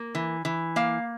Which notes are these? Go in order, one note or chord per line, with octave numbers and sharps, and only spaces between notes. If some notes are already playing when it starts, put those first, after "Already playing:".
Already playing: A#3
E3
E3
A#3 F5